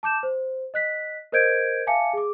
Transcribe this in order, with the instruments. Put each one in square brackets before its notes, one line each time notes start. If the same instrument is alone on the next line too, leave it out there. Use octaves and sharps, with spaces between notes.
[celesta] A5 D6 G6 E7
C5
D#5 F#6 B6
A#4 C5 D#5 G6 G#6 D7
E5 F5 G#5 A5 D6 C#7
G#4 D6